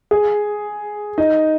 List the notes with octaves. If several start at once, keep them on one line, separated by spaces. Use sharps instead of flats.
G#4
D#4